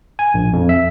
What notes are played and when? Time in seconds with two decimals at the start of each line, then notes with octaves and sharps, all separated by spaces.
0.19 G#5
0.34 A#1
0.53 F2
0.69 E5